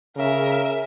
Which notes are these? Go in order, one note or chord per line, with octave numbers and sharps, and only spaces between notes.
C#3 A#4 E5